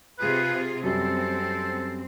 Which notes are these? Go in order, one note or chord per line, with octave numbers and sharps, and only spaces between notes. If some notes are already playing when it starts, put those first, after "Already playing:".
C3 F4 G#4 B4
F#2 G3 C4 A4